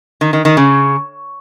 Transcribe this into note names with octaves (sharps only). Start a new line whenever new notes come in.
D#3
D#3
D#3
C#3